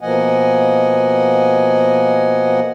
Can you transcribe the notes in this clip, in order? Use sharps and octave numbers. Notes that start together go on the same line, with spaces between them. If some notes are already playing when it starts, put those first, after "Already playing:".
B2 F3 A#3 D#5 F#5 G#5